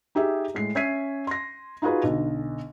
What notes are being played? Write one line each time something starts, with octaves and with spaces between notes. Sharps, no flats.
D#4 G4 G#4 E5
A2 G#3 C7
C#4 E5 G#6 B6 C7 D#7
C6 A#6
D#4 F4 F#4 G#4 B4
B1 D3